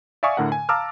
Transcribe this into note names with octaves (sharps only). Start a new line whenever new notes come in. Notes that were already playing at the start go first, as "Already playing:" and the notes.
D5 E5 F5 G#5 C#6 D#6
A2 D3 A#4 F#5
G#5
F5 A5 A#5 D6 E6 F6